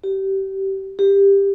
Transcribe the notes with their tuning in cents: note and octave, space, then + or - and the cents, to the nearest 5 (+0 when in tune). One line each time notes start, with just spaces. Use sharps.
G4 -25
G4 +15